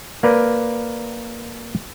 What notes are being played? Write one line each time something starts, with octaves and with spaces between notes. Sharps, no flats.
A#3 A#4 B4 D5